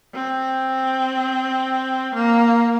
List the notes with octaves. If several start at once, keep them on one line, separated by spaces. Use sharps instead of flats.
C4
A#3